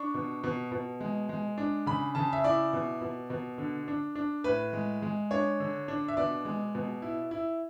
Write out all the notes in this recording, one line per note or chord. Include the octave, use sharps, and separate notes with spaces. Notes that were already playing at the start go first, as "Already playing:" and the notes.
Already playing: D4 C#6
B2
B2
B2
G#3
G#3
D4
C#3 B5
C#3 A5
E5
E4 D5
B2
B2
B2
D3
D4
D4
A2 B4
G#3
G#3
D4 C#5
D3
D4
E5
B2 D5
G#3
B2
E4
E4